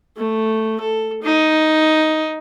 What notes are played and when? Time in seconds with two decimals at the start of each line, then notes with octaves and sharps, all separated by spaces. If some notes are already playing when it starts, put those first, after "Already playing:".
0.17 A3
0.80 A4
1.23 D#4